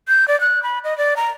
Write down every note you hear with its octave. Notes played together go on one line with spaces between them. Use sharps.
G6
D5
F#6
B5
D#5
D5
A#5